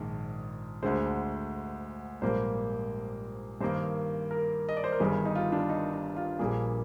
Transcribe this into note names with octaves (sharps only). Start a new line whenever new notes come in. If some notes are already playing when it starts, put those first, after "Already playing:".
Already playing: A#1 G#2 D#3 G#3
D2 D3 G#3 C5
A#1 G#2 G3 A#3 C5
G2 D#3 A#3 C5
A#4
D#5
D5
C5
A#4
G1 G2 D#3 G3 G#4
D#4
F4
D4
D#4
D#4
F4
A#1 A#2 G3 A#3 G#4